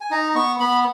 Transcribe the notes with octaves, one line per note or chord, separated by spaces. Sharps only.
G#5
D#4 A#5
B3 C#6
B3 B5